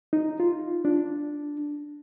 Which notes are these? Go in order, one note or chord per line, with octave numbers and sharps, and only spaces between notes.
D#4
F4
D4